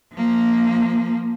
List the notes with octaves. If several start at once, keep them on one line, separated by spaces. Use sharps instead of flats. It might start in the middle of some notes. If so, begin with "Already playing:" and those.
F3 A#3